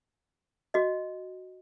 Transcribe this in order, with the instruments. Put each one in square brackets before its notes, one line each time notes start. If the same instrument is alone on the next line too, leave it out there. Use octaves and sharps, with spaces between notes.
[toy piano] F#4 D#5